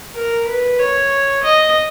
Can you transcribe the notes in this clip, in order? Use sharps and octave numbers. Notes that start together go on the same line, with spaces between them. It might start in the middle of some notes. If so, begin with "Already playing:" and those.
A#4
B4
C#5
D#5